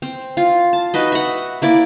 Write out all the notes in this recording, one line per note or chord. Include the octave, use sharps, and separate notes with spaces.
C4
F4
A5
D#4 F#4 B4 D#5
E5 F#5
A#3 E4 D5